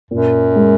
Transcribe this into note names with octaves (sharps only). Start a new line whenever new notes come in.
F#2 A#2
G#3